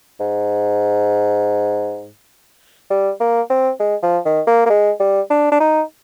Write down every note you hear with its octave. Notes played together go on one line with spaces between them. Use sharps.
G#2
G3
A#3
C4
G#3
F3
D#3
A#3
A#3
G#3
G3
D4
D4
D#4